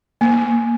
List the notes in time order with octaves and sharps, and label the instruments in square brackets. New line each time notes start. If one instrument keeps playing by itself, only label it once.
[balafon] A#3